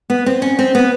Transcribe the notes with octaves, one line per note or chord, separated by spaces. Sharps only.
B3
C4
C#4
C4
B3